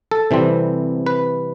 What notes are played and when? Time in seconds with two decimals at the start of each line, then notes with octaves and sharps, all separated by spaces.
0.11 A4
0.31 C3 E3 G3 C4
1.06 B4